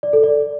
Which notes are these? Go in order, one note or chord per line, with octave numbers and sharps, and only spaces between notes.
D5
A4
D5